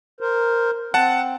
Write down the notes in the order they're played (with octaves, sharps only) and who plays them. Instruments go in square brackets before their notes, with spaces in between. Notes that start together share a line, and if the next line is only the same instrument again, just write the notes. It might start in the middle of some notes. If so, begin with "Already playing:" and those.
[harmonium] A#4 C5
[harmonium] C4 [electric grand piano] F#5 A5